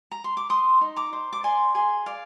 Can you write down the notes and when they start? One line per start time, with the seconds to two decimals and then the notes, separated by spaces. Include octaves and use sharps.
0.11 A#5
0.24 C6
0.37 D6
0.49 C5 C6 D#6
0.81 D#4
0.96 A#5 D6
1.13 C5
1.33 D6
1.43 D5 G#5 C6
1.75 G#4 G#5 C6
2.06 D5 F5